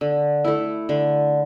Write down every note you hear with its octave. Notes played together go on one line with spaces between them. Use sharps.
D3
A3 E4
D3